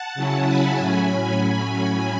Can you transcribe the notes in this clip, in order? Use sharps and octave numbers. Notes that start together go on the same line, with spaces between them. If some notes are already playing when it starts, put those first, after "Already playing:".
Already playing: F#5 A5
C#3 F#3 C#4 E4
G#5 B5
A2 F#3 C#4